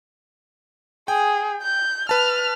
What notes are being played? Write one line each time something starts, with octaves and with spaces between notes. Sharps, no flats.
G#4 G5
G6
B4 A5 F6